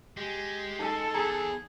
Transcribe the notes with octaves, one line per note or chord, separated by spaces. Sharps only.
G#3 G4
D#4 A4 A5
E2 G#4 A#5